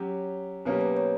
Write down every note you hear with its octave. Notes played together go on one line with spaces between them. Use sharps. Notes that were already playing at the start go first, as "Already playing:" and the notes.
Already playing: F#3 C#4 G4
B2 F#3 A#3 C#4 G4 B4
B4
C#5